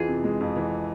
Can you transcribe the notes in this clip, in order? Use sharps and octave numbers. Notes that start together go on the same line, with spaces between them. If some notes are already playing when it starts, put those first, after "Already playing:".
Already playing: F2 E3 F4 G#4
C3
G#3
F2
E3